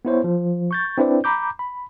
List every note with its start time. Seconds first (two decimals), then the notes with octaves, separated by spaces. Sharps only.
0.05 B3 E4 C5 C#5
0.24 F3
0.71 C#6 G6 A6
0.98 C4 D4 E4 B4 C5 D5
1.24 A#5 B5 D6 G6
1.59 B5